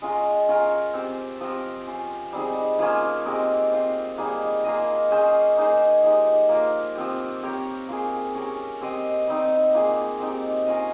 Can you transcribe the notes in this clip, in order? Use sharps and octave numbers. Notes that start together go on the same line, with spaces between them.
G#3 C#4 F4 A#4
C#4 F4 A#4 C#5
C4 G4 C5
F3 C4 G4 A#4
C#4 F4 C5
G3 C4 D#4 G#4
F3 A#3 C#4 F4
G#3 C4 G4 A#4
C4 F4 C5
G3 A#3 D#4 G#4
A#3 F4 G#4 D#5
C#4 G#4 C5
A#3 D#4 G#4 C5
F3 G#3 D#4 G4
A#3 F4 A#4
F3 C4 G4
C4 G4 A#4 C#5
A#3 F4 G#4
C#4 G4 A#4 C#5
C4 G4 C5 D#5
G3 C4 D#4
A#3 F4 G#4
C4 D#4 G4
C#4 F4 A#4 D#5